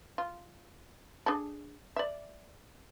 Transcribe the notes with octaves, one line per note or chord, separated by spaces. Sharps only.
F4
D4 G#4 A4
D5 E5